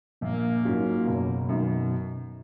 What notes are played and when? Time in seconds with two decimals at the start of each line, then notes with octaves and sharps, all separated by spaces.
0.21 A#1 A#3
0.65 G#2 F#3 C#4 F4
1.07 F#1 B2
1.49 F#2 D#3